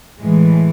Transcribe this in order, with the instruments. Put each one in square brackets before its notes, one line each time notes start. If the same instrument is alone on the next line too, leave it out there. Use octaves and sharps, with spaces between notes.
[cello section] A2 E3 G#3